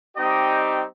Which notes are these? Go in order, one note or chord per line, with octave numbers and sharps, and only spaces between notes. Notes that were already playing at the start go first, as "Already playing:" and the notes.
G3 C4 D#4 G4 D#5 G5